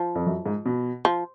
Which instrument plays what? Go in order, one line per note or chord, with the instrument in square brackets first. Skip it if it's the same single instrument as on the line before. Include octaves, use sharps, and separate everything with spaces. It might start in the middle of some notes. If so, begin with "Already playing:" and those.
Already playing: [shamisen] F3
[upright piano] F2
F#2
G#2
B2
[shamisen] F3